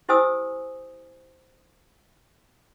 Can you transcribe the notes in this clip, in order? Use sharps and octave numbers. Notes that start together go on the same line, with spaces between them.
E4 G4 C5 G#5 D#6 E6